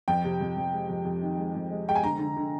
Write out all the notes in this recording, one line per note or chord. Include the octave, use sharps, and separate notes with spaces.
F2 G5
C3
F2
F2
G#3
F2
F2
D#3
G#3
F2
G#3
G#3 G5
G#5
D3 A#5
D3
D3